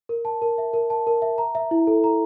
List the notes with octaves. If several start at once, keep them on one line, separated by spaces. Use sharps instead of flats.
A#4
A5
A#4
E5
A#4
A5
A#4
E5
A#5
E5
E4
A4
A#5